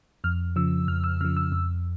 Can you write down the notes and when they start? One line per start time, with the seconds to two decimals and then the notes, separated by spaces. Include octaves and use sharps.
0.24 F2 F6
0.56 C#3 F3 E6
0.88 F2 F6
1.04 E6
1.21 C#3 F3 F6
1.37 E6
1.52 F2